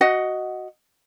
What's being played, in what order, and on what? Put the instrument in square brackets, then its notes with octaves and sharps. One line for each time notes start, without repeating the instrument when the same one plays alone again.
[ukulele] F#4 D#5 F#5